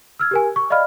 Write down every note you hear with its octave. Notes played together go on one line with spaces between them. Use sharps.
E6 F6 G#6
G4 A#4 G#5
C#6
D5 D#5 F5 B5 F6